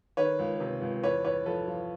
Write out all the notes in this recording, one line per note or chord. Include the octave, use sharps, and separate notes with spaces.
D#3 B4 C#5
C#2
C3
C#2
E2 B4 C#5
E2 B4 C#5
F3 A4 B4
F3